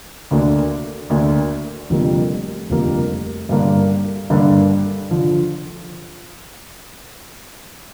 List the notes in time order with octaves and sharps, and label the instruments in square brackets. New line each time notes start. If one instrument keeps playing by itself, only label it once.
[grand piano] D2 D3 A#3 D4
D2 D3 A#3 D4
F1 F2 D3 G3 A#3
F1 F2 D3 G3 A#3
G2 D3 A#3 D4
G2 D3 A#3 D4
D3 F3